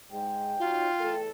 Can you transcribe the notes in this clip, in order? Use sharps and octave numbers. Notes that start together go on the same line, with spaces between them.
G#2 G#3 G5
F#3 D#4 F4
E2 A3 A4